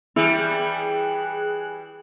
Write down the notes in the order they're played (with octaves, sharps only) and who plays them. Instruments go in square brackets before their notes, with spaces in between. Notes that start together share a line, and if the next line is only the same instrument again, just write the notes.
[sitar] E3 G3 [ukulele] E4 [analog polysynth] G#4 F#6